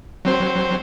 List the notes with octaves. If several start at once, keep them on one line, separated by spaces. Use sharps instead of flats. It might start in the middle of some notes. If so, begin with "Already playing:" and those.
F#3 C4 C5